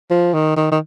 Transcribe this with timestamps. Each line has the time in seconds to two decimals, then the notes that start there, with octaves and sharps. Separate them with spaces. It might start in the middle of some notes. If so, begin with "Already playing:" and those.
0.11 F3
0.34 D#3
0.56 D#3
0.71 D#3